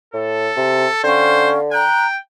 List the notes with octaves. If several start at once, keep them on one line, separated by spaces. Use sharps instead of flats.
A2 A4
C3
D3 C#4 C5 F5 G5
G5 A#5 F#6